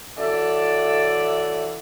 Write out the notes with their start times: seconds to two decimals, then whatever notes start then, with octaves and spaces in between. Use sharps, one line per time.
0.18 E3 C#4 F#4 A4 D5 E5